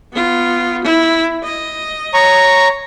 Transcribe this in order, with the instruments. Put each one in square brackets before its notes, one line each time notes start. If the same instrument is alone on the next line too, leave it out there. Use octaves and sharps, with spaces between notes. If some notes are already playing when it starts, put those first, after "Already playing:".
[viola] B3 F4
E4
D#5
[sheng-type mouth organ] C#5 A#5 C#6